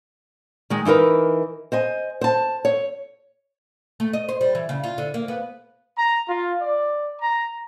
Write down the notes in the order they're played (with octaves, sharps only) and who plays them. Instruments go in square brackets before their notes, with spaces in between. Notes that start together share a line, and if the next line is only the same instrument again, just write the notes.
[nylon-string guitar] D#3 G#3
E3 D#4 E4 A#4 B4
C5 D#5 G#5
C5 A5
C#5
[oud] A3
D#5
C5
G3
E3
C#3
F4
D3
A#3
B3
[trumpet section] A#5
F4
D5
A#5